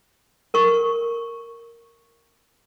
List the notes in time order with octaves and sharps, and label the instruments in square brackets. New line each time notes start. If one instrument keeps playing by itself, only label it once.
[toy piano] A#4 C#6